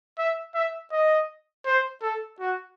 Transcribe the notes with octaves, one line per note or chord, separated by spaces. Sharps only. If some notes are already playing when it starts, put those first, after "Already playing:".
E5
E5
D#5
C5
A4
F#4